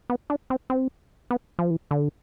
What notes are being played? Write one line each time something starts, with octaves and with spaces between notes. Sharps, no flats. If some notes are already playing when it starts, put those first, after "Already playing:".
B3
D4
C4
C4
B3
F3
E3
D3